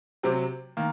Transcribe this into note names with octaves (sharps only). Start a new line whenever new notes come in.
C3 F#3 C4
D#3 A#3